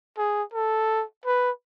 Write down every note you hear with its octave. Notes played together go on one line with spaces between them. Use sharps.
G#4
A4
B4